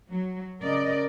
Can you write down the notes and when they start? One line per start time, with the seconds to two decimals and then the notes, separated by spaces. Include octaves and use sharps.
0.10 F#3
0.61 C#3 A#4 D5 D#5